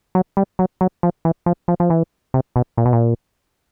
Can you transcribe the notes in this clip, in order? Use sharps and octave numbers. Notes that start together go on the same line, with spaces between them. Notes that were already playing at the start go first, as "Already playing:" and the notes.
F#3
G3
F#3
F#3
F3
E3
F3
F3
F3
E3
C3
B2
A#2
B2
A#2